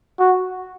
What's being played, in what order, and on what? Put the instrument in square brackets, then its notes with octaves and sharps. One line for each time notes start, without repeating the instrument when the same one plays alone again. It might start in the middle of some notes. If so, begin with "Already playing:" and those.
[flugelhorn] F#4